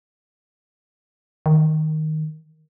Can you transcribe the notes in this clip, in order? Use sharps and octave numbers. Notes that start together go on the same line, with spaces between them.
D#3